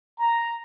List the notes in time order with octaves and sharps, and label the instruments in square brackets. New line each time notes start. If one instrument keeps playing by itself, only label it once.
[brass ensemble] A#5